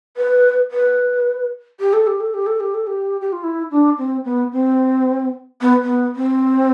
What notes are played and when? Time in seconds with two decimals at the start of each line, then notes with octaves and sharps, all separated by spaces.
0.17 B4
0.71 B4
1.80 G4
1.93 A4
2.07 G4
2.20 A4
2.34 G4
2.46 A4
2.60 G4
2.74 A4
2.87 G4
3.21 G4
3.32 F4
3.44 E4
3.71 D4
3.98 C4
4.25 B3
4.53 C4
5.61 B3
5.83 B3
6.16 C4